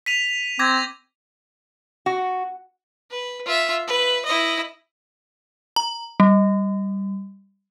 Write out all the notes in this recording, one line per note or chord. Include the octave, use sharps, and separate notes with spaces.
B6 D#7 F7
C4 D6 G#6 A#6
F#4
B4
F4 E5
B4
E4 D#5
A#5
G3